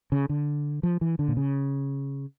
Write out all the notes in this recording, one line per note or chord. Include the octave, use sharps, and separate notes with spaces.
C#3
D3
F3
E3
D3
A#2
C#3